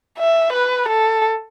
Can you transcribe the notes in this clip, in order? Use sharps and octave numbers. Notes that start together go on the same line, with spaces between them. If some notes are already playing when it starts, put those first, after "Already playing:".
E5
B4
A4